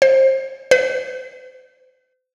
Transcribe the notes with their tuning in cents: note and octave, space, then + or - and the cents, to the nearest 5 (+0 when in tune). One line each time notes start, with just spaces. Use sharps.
C5 +25
C5 -40